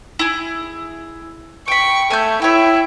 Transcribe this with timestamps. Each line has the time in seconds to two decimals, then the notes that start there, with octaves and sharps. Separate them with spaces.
0.19 E4 G#4
1.68 G5 B5 C#6
2.10 A3 G#5 G6
2.42 E4 C#5 G5